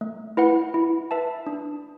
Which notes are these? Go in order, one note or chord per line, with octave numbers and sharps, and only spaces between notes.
A3
E4 B4 F#5
E4
B4 E5 A5
D4